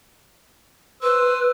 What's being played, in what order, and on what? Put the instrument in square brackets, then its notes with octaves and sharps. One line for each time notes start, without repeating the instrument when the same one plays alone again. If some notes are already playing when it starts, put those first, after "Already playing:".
[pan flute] B4 [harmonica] C5 E6